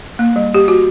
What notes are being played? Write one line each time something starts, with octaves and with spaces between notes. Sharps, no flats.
A#3
G3
G4
F#4